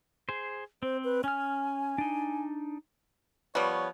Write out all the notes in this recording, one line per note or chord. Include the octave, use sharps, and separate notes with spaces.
G#4 C5
C4 C5
B4
C#4 G#5 F6
D4 D#4
F3 G3 B3 C#5